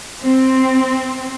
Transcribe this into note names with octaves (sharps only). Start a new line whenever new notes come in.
C4